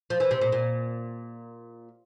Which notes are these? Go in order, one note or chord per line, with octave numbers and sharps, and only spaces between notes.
F3
E3
C3
A#2
A#2